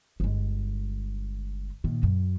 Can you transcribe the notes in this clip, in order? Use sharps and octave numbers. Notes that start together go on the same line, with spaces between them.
G1 G#3
A#2 D#3
F#2